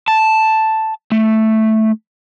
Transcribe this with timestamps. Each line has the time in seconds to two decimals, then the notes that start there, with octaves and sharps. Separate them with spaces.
0.08 A5
1.12 A3